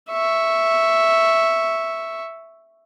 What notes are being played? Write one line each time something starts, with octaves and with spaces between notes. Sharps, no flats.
E5 C#6